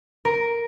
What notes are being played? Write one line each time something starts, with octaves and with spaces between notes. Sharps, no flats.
A#4